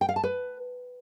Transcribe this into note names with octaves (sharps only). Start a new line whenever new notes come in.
G5
F5
A5
B4